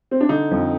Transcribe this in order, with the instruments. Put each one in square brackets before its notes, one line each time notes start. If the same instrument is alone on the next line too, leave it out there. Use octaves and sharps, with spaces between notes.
[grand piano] C4
D4
D3 D#4
F2